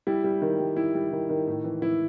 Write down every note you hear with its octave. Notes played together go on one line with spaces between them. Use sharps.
G3 E4
G3
D#3
G3
G3 E4
G3
D#3
D#3
A2
E3
E3 E4